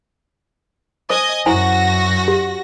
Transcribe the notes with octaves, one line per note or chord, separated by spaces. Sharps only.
C5 D#5 G#5 D#6
F#2 E4 F#4 C5 G#5 A#6
G4